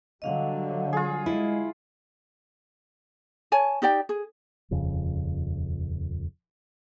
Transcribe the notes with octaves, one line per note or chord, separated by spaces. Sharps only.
D3 F#3 G3 D#5 F5 F#5
F4 G#4
G#3 E4 D#5
C#5 G#5 A5
D#4 G4 D5 G5
G#4
D#1 F2 C#3